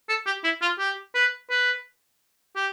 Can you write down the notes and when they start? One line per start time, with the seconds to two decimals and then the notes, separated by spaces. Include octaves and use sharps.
0.09 A4
0.26 G4
0.44 E4
0.62 F4
0.79 G4
1.15 B4
1.50 B4
2.56 G4